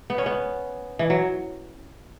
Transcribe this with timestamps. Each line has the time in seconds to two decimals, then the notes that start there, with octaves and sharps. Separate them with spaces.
0.10 B3
0.18 C#4
0.26 B3
0.99 E3
1.10 F#3